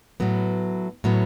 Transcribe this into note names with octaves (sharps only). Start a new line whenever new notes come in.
A2 F#3 B3
A2 F#3 B3